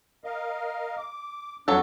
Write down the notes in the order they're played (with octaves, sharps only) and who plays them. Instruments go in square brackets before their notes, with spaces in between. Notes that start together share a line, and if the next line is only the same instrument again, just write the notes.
[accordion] A#4 D#5 F5
D6
[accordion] F2 D4 F#6 [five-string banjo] F#3 A4